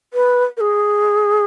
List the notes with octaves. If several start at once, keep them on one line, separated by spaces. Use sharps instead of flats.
B4
A#4
G#4